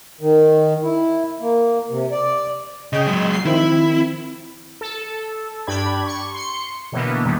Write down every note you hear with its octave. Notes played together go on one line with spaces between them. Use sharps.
D#3
E4
A#3
C3
D5
C#3 D#5 G5
F#3 G#3
C7
D#3 F3 C4 E4
A4
G2 D4 G4 D5 B5 G#6
C#6
C6 C#7
B2 D3 E3 A#3 B3
E2 A#2 D#3 G3